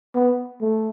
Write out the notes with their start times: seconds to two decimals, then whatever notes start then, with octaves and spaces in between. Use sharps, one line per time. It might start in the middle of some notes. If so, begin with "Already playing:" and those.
0.15 B3
0.61 A3